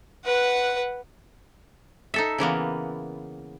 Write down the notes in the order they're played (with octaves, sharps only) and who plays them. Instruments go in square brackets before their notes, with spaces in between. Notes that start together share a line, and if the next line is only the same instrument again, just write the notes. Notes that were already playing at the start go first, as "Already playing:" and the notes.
[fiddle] B4 F#5
[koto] D#4 A4 E5
C#3 E3 A#3 B3